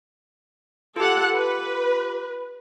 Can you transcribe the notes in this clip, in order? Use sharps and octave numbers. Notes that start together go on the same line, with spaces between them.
F4 G4 A4 F#5
B4